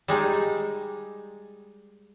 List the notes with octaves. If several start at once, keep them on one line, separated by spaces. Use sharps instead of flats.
G3 G#3 D#4